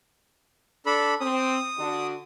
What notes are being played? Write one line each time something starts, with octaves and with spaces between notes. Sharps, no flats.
D4 A4 B5
C4 D#6
D3 D4 F#4